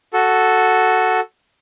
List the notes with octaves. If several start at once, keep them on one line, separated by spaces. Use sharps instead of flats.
F#4 A4